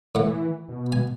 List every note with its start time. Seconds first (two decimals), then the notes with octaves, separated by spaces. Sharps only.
0.15 A2 E3 F#5
0.68 B2
0.92 G#5